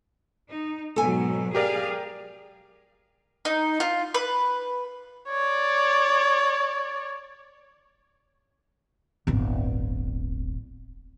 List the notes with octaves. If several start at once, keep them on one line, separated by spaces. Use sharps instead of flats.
D#4
G#2 B2 F#3 A4 G#5
G4 G#4 A#4 D5 F5
D#4
F4
B4
C#5 D5
D1 G1